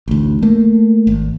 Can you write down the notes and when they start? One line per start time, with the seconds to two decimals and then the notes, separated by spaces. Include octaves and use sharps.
0.08 A1 D2
0.42 A3 A#3
1.07 G#1